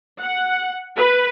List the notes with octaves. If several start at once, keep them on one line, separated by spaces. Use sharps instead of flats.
F#5
B4